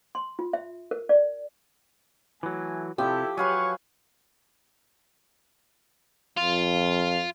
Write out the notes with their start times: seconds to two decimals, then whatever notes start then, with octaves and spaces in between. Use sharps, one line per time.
0.15 C6
0.39 F4
0.53 E5
0.91 A#4
1.09 D5
2.43 E3 F#3 A3 G#5
2.98 C3 F3 E4 G4 A4
3.37 F#3 B4 C#5 F5 G#5 C#6
6.37 F2 F4